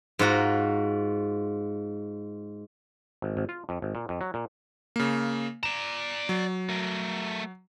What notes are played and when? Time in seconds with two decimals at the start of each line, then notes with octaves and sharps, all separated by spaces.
0.19 G#2 F4 F#4 A#5
3.22 G#1
3.37 G#1
3.49 F4
3.69 F2
3.82 G#1
3.95 A#2
4.09 F2
4.21 F#3
4.34 A#2
4.96 C#3 A#3
5.63 D5 A#5 E7
6.29 F#3
6.69 A3 A#4